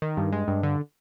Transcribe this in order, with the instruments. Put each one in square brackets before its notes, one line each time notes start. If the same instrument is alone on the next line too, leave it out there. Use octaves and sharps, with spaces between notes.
[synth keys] D#3
G2
G#3
G2
D3